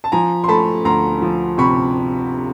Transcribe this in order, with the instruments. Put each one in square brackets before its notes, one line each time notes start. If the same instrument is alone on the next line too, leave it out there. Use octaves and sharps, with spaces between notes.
[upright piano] A5
F3 G#5 A#5
C6
A3 A5 B5
D2 A#5 C6
F3
C3 B5 C#6